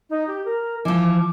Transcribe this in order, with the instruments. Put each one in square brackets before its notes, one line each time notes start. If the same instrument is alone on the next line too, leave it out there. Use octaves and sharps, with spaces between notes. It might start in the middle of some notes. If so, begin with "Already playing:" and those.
[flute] D#4
G4
A#4
[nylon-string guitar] E3 F3 [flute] D6